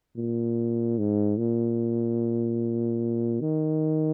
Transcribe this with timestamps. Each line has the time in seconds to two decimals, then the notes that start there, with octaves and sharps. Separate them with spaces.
0.17 A#2
0.99 G#2
1.38 A#2
3.40 D#3